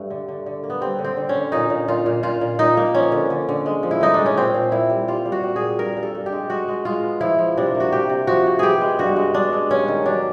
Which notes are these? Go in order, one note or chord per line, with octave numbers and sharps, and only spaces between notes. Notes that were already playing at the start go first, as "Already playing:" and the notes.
Already playing: G2 A3
D3
D3
D3
A#3
B3
G3 C4
D3
C4
D3
C#4
D3
A#2 D#4
A#2
A#2 F4
A#2
A#2 F4
A#2
A#2 D#4
A#3
F3 C#4
D3
D3
D3
G#3
F3
E4
D3 D#4
G#3 D4
C#4
A#2 C4
A#2
A#2 E4
G3
G3 F4
G3
F#4
G3
A#2 G#4
G2 A#4
G2
A4
G2
G4
G#3
G#3 F#4
G#3
G#3 F4
B3
F3 E4
F3
C3 D4
A#3
F#4
C3 G4
C3
F3 F#4
C3
B3 G4 G#4
G#3
G2 F#4
G#3
G#3 D4
G#3
G2 C#4
D#3
F#3 D4